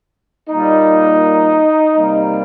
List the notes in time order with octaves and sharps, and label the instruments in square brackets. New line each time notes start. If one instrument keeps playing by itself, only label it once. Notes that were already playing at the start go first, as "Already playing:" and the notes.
[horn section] A#2 G3 A#3 D#4
C3 G3 A#3